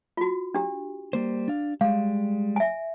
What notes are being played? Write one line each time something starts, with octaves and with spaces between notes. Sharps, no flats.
F4 F#4
D4 G4
G3 A#3 C5
D4 F5
G3 G#3 F5
E5 G#5